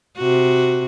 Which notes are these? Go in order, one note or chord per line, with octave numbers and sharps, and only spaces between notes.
C3 F#4